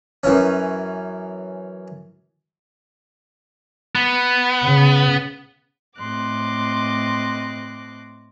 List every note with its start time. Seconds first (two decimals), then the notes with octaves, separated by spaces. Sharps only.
0.24 F#2 E3 C#4
3.95 B3
4.64 C#3
5.98 A2 C4 D#5 C6 D6 F#6